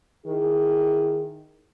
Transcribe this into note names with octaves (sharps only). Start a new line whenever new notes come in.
D#3 E4 G#4